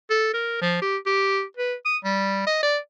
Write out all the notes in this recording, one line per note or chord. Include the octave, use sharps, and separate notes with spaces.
A4
A#4
F3
G4
G4
B4
D#6
G3
D#5
D5